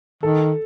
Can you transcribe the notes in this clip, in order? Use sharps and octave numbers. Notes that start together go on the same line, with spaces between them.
D#3 A4